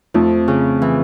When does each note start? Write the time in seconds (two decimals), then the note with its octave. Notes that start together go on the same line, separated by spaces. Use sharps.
0.14 F2 F3 A3
0.48 C#3
0.82 E3